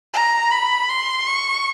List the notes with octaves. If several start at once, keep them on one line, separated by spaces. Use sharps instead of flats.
A#5
B5
C6
C#6